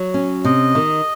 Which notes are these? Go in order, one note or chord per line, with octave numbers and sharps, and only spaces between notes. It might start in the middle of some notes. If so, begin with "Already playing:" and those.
Already playing: F#3
C#4
C3 D#5
D#3